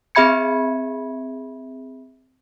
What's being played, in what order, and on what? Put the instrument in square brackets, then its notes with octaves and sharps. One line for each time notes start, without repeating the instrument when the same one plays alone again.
[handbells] C4 G#4 E5 B5 G#6 C#7